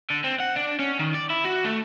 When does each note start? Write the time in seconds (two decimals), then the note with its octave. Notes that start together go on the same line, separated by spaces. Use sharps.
0.10 D3
0.24 C4
0.40 F#5
0.56 D4
0.79 C#4
0.99 D#3
1.14 D5
1.30 E4
1.45 F#4
1.64 A3